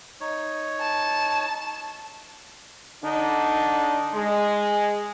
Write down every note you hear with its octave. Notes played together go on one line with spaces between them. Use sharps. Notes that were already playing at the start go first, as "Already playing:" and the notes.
D#4 C#5
A5
D3 D4 D#4
G#3